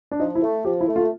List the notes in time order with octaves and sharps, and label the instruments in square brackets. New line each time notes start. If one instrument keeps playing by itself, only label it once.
[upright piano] D4
[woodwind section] F3 [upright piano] D#4
[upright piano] E4
[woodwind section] A3
[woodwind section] F3 [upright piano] G4
[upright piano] E4
[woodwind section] A3
[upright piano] F4